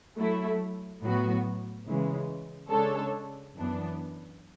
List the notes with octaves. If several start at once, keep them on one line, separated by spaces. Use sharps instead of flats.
F#3 A3 E4
A2 F#3 B3 F#4
C#3 E3 G#3
C#3 G#3 D4 A4 C#5
F#2 E3 B3 D4